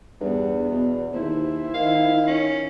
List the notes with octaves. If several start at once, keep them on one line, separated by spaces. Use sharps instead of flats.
E2 G2 B3
B2
D#2 E4 C5
D#3 F5
C#4